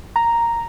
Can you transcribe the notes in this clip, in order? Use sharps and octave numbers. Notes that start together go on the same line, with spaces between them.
A#5